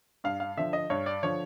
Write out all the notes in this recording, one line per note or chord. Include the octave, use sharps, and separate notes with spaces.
G2 F5
F5
D3 F3 E5
D#5
G2 C#5
D5
D3 F3 C#5